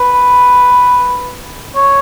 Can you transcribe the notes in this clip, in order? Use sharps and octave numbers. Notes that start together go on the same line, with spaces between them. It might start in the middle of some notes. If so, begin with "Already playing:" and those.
Already playing: B4
C#5